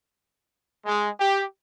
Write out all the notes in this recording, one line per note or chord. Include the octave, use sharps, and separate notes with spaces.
G#3
G4